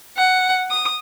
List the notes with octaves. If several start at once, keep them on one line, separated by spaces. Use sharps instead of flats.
F#5
D#6